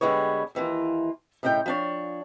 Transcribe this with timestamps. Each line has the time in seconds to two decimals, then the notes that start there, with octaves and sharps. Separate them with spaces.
0.01 D3 G3 G#3 B3 C#5
0.55 D#2 E3 A#3 F4
1.43 A2 C#3 D#4 F5 G5
1.66 F3 D4 C#5